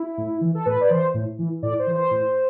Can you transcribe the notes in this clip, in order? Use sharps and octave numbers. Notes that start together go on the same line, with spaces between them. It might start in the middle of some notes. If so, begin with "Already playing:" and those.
Already playing: E4
A2
E3
A4
A2 B4
D5
E3 C5
A2
E3
A2 D5
C5
E3
C5
A2